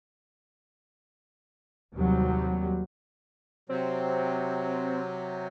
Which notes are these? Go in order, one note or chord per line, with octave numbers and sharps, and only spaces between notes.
D#2 C3 F#3 G3
C3 F#3 C4